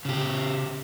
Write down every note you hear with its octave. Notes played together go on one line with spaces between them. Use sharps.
C#3 G4